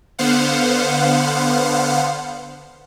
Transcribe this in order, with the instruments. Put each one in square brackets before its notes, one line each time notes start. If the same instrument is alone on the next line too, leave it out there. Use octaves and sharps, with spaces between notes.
[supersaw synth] D3 B3 C5 F5 F#5